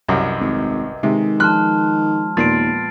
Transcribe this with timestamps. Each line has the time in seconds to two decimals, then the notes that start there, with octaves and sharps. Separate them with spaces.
0.08 C2 F#2 B4 D#5 E5
0.40 G#1
1.03 C3 D#3 G#3
1.40 F3 A5 C6 F6 F#6
2.37 D#2 A#2 B3 A6 C7 D7